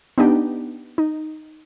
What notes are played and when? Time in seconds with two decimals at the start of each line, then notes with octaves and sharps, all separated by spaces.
0.18 B3 D4 D#4 G4
0.98 D#4